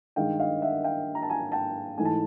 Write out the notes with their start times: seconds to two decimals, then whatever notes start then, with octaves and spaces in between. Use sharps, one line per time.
0.16 G2 D#3 G#3 F5 G5
0.39 D#5 F5
0.62 E5 F#5
0.84 F5 G5
1.15 A#5
1.23 A5
1.30 G#5 A#5
1.52 G5 A5
1.97 G#2 E3 A3 G#5
2.05 A5